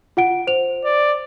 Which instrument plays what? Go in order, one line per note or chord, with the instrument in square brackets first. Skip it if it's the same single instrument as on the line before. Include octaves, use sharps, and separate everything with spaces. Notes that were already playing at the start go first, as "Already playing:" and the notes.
[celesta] F4 F#5 D7
C5 F7
[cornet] D5